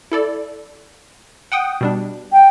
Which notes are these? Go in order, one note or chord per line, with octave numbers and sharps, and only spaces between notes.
E4 A4 D5
F#5 G5 D#6
B2 G3 D4
G5